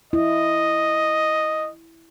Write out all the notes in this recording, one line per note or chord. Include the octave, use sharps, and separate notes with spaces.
E4 D#5